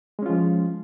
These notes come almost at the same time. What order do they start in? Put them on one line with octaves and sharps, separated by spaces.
G#3 C#4 F4 F3